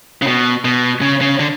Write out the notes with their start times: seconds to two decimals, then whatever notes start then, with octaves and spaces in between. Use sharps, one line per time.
0.22 C#3
0.27 B2
0.65 B2
1.01 C#3
1.21 C#3
1.39 D3